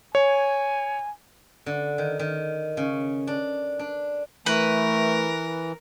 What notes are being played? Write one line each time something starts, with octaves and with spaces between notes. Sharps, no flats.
C#5 G#5
D3
D#3
D#3
C#3
D4
D4
E3 A3 A#4 B4